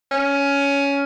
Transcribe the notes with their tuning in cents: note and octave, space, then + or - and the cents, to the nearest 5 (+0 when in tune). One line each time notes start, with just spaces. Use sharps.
C#4 +15